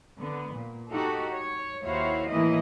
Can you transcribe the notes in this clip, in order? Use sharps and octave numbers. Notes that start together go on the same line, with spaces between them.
D3 B3
A#2
D#4 F#4 G4 A4
C#5
D#2 E4 F#4 C5 C#5 F5
D#2 A2 E3 A#3 E4 D#5